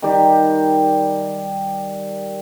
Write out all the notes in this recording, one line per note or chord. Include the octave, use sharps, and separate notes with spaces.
D#3 G3 G4